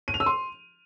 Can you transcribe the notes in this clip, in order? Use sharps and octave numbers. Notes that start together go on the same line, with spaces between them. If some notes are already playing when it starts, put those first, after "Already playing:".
D#7
F7
E6
C6